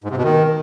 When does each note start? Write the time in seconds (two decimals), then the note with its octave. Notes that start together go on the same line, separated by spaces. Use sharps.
0.04 G#2
0.11 C3
0.17 B2
0.24 D#3